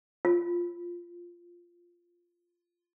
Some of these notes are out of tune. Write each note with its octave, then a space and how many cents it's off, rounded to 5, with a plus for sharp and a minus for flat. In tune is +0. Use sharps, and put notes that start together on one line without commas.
F4 -5